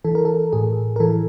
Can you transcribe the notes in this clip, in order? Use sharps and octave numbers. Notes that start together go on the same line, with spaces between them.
E3 A4
A#4
A4
A2 G#4
A#4
E3 A4